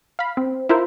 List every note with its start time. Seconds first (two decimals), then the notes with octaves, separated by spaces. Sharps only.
0.19 F5 B5
0.37 C4
0.69 E4 F4 A#4 C5